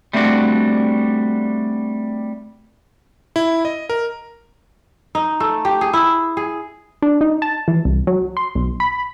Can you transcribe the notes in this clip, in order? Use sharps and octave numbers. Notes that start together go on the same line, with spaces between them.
G3 A3 C4 D4 F#4
E4
D#5
A#4
D#4
A3
G4
G#4
E4
G#4
D4
D#4
A5
E3
C2
F#3
C6
B1
B5